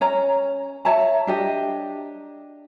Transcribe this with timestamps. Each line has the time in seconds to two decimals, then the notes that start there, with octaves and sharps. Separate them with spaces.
0.01 C#4 C#5 A#5
0.85 C#5 E5 A5 A#5
1.27 D4 G4 D#5